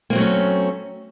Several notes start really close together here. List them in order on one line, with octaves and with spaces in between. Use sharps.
A#3 C4 F#3 A3 C#4